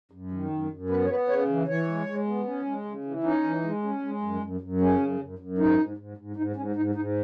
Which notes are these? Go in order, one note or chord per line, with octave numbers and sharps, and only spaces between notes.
F#2
D#3
F#2
F#2
B3 B4
C#5
B3 B4
C#3 C#5
E3
E3 C#5
G#3
G#3
B3
C#4
G#3
C#3
E3
C#4 D#4
E3
G#3
C#4
G#3
F#2
F#2
F#2
C#3 C#4
F#2
F#2
F#2
G#2 D#4
G#2
G#2
G#2
G#2 D#4
G#2 C#4
G#2 D#4
G#2 D#4